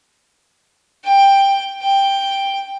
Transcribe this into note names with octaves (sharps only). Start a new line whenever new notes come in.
G5
G5